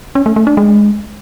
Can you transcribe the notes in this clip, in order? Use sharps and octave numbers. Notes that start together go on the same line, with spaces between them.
C#4
A3
A3
D4
G#3